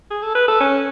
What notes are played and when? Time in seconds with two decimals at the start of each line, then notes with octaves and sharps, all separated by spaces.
0.10 G#4
0.22 A4
0.35 B4
0.48 A4
0.60 C#4